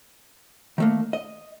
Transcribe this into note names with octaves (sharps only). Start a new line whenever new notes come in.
D#3 A3 A#3
D#5